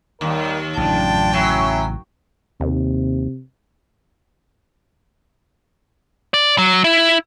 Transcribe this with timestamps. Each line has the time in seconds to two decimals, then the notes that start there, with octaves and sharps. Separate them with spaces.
0.21 D#2 G3 A#4 D#5
0.77 A1 F#2 C#3 D4 F4 G5 A5
1.33 F#3 C#4 E4 E5
2.61 D#2 C3
6.34 D5
6.58 F#3
6.84 E4